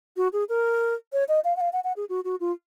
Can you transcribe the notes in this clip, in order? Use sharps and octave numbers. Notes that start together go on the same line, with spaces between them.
F#4
G#4
A#4
C#5
D#5
F5
F#5
F5
F#5
F#5
G#4
F#4
F#4
F4